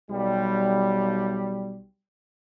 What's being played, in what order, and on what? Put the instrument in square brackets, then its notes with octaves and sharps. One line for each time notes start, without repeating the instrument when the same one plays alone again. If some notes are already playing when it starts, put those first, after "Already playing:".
[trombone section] B1 G3